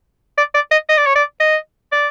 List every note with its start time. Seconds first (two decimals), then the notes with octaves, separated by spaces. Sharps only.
0.38 D5
0.54 D5
0.71 D#5
0.89 D#5
0.98 D5
1.06 C#5
1.16 D5
1.40 D#5
1.92 D5